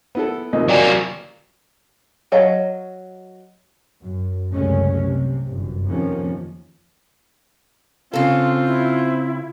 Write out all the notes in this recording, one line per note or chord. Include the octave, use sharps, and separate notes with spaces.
B3 E4 A4
D#2 C3 F3 D#5
F#3 A#3 D5 G5 G#5
F#3 C#5 D#5 F5 A#5
F#2
C2 F#2 C#3 G#3 A3 C#4
C3
G1 F#2
F2 C3 D#3 F3 A#3 C#4
C#3 C4 F4 A4 F5
E4